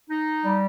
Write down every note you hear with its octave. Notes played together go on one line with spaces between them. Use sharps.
D#4
G3